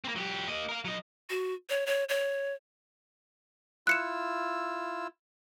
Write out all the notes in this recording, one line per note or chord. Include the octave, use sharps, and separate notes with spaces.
A#3 C4
F#3 G4
A#3 D#5
A#4 F5
F#3 D#5
F#4
C#5
C#5
C#5
E4 F4 E6 F#6 C#7 E7